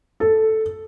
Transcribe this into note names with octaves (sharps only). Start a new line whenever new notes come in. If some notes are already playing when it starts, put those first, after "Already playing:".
A4